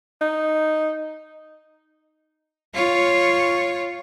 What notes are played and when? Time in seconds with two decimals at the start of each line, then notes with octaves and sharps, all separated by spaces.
0.21 D#4
2.74 F4 C#5